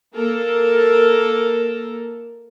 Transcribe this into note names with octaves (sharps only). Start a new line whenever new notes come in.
A#3 A4 A#4